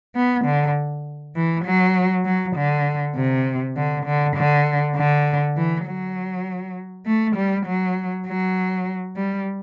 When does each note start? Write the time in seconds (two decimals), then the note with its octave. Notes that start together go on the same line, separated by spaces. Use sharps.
0.15 B3
0.45 D3
1.36 E3
1.65 F#3
2.25 F#3
2.56 D3
3.16 C3
3.77 D3
4.06 D3
4.36 D3
4.96 D3
5.57 E3
5.86 F#3
7.06 A3
7.36 G3
7.66 F#3
8.27 F#3
9.16 G3